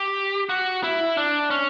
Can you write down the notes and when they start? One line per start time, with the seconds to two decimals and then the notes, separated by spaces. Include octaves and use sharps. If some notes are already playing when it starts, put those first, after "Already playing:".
Already playing: G4
0.49 F#4
0.84 E4
1.17 D4
1.51 C#4